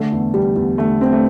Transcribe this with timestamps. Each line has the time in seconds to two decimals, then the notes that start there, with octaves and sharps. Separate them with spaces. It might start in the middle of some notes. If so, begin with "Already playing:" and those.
Already playing: D3 A3
0.12 E2
0.34 E2 G3
0.56 E2
0.78 D3 A3
1.01 D3 C4
1.13 A3